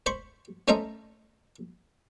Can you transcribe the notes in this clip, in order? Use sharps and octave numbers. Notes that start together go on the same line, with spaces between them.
C5 B5 C#6
A3 C#4 C5 D#5 E5 A#5